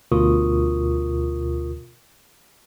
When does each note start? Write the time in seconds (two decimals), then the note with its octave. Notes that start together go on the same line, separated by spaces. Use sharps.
0.12 D2 B2 F4 A#4 C#6 D#6